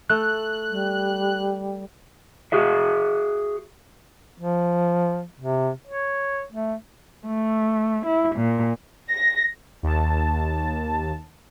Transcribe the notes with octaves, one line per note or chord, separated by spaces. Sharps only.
A3 F#6
G3
F#4 G#4 E5
F3
C3
C#5
A3
A3
E4
A#2
A#6
D#2 A5